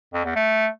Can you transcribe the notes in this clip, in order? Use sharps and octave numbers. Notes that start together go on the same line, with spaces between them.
F2
E2
A3